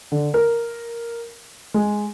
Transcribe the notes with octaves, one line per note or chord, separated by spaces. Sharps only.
D3
A#4
G#3